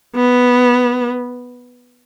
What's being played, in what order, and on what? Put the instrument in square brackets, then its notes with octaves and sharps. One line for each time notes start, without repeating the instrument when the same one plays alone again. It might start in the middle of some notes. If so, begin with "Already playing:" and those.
[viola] B3